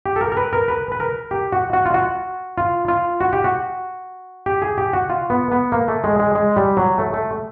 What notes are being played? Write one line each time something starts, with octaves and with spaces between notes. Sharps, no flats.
G4
A4
A#4
A#4
B4
A#4
B4
B4
A#4
G4
F#4
F#4
F4
F#4
F4
F4
F#4
G4
F#4
G4
G#4
G4
F#4
F4
B3
B3
A#3
A3
G#3
G#3
G#3
G3
F#3
A3
A3